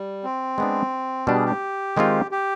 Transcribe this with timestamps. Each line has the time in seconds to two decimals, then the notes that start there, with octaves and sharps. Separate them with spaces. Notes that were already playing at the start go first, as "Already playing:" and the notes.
Already playing: G3
0.24 C4
0.58 G#3 B3 D4
1.27 B2 G3 D4 G4
1.35 G#4
1.45 G4
1.97 D#3 G#3 C4 F4 G#4
2.31 G4